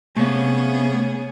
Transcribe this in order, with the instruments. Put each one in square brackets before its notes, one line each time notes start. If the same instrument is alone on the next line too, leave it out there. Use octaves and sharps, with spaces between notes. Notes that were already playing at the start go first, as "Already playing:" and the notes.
[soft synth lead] C3 [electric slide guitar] A3 F5 [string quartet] B3 C#4 G#4